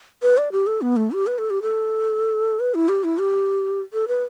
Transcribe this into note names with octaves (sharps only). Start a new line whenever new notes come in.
B4
D5
G4
A4
B3
A3
G4
B4
A4
G4
A4
B4
E4
G4
E4
G4
A4
B4